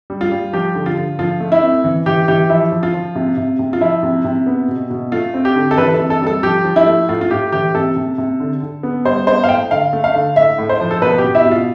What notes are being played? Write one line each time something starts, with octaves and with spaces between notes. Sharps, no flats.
G3
F4
G3
F3 G4
D3
F4
D3
F3 F4
A3
E4
C4
E3
E3 G4
E3 G4
F3 E4
F3
F4
F3
C3
C3
C3
F4
F3 E4
C3
C3
B3
B2
B2
A3 F4
C4
G4
D3
A4
E3 B4
A4
C3
A4
G3
A4
F3 G4
F3
E4
A3
A2 F4
F4
A2 G4
E3 G4
C3 A4
C3
C3
D3
D3
B3
G3 C5
B3 C5
F5
A2 G5
D3 F5
A3
F5
D3
A2 E5
A2
C5
F3
A4
B2 B4
G4
B2
E4
B2
F4